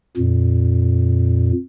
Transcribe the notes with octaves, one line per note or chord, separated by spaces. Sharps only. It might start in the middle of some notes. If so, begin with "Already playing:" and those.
F2 A#2